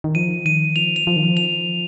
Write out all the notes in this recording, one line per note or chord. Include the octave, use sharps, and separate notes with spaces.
D#3
F3 D#7
D#3 D#7
F3 F7
F7
F3
D#3
F3
F7